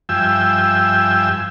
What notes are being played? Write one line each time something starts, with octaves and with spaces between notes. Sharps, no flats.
G2 F3 E5 G5 G#5 E6